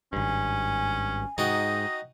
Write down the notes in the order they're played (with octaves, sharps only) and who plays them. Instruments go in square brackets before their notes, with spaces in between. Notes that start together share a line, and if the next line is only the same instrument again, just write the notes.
[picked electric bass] G#1 G2 [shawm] C#4 [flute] G#5
[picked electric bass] G#2 [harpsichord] D#4 F#4 G5 [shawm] D#5